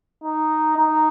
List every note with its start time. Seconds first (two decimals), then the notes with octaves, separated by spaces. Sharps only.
0.23 D#4
0.77 D#4